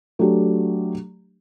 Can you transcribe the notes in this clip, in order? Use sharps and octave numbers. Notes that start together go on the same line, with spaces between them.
F#3 A3 D4 G4